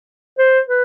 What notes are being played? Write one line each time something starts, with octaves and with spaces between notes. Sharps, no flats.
C5
B4